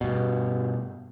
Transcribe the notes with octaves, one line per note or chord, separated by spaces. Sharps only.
G2 B2